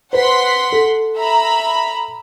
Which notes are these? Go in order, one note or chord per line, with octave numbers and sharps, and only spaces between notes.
B4 C5 F#5 C6 B6
A4
E5 A#5 B5